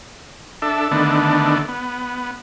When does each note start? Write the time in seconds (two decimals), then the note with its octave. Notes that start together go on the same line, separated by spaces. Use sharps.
0.62 D4 A4 E5
0.91 D3 D#3 A3 B3 D4
1.69 B3